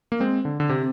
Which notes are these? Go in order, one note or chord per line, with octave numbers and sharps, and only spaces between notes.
A#3
G#3 C4
D3
D3
C3 C4